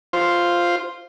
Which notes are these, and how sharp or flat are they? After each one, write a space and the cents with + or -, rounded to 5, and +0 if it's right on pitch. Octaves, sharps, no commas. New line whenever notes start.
F4 +0 C5 +0